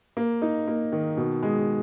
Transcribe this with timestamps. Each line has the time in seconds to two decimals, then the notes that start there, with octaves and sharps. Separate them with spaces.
0.17 A#3
0.42 D#4
0.67 A#3
0.92 D#3
1.17 B2
1.43 G#3